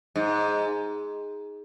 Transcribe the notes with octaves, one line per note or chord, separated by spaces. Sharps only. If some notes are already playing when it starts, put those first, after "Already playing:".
G#2